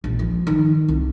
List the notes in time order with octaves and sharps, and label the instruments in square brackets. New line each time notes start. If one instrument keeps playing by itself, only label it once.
[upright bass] A#1
F3
D#3
C2